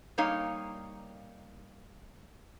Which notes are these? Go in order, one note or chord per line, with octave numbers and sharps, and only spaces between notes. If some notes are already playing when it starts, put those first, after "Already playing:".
G3 A#3 D#4 C#5 F5